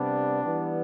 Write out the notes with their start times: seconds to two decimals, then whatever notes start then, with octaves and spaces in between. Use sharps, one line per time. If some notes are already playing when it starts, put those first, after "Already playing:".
Already playing: C3 G3 B3 D4
0.42 E3 G3 B3